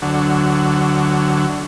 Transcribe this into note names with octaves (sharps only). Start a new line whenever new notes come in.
D2 F#3